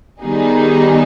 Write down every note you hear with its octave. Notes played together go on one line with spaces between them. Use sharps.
D#3 G3 B3 D#4 G#4